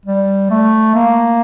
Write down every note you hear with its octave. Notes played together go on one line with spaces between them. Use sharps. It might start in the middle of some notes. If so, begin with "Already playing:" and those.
G3
A3
A#3